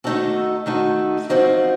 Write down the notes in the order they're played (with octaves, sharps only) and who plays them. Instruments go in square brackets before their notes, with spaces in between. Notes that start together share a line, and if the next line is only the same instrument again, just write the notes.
[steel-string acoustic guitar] D#3 A3 D#4 F#4 A4
D#3 A3 D#4 F#4 A4
F#2 F3 C4 D#4 F#4